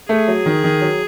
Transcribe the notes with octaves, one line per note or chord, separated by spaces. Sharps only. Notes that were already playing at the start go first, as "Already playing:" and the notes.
A3 G#4
F#3
D#3
D#3
F#3